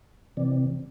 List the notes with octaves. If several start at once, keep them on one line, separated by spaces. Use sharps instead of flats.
C3 E3 C4 D5